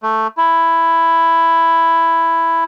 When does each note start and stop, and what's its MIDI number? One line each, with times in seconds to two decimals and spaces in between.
0.03 0.27 57
0.37 2.64 64